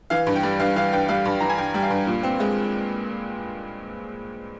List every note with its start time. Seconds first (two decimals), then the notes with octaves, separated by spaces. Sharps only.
0.10 E3 F5
0.27 G2
0.36 G5
0.43 G3
0.60 G2 F5
0.76 E3 F5
0.93 G2 G5
1.09 G3 F5
1.25 G2
1.40 E3 A#5
1.50 G#5
1.58 G2 G5
1.74 G3 G5
1.82 F5
1.90 G2
2.07 A#2
2.23 C4
2.40 G#3